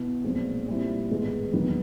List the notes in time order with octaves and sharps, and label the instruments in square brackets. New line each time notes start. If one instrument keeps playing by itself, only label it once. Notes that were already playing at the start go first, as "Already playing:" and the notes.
Already playing: [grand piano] B2 B3 E4
B1 A#2 F3 G#3 C4
A#2 G3 C4 E4
A1 G#2 D#3 G#3 B3
E1 D#2 D#3 F#3 B3